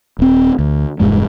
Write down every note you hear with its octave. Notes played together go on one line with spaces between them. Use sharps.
D#1 C4
D2
E1 C#2 G2 G#3